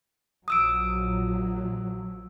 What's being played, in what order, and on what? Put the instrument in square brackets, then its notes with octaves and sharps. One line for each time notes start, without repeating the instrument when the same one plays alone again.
[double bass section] A#1 F3 F#3 [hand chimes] D#6 E6 D7